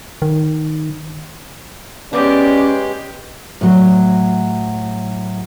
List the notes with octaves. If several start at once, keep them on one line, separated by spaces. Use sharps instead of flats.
D#3
G#3 B3 C#4 G4 D5
A2 F#3